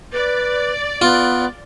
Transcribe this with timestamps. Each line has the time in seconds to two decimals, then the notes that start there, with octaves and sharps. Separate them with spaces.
0.13 B4 D5
1.02 B3 F4